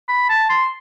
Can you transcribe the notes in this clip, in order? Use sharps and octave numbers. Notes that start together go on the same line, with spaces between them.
B5
A5
C6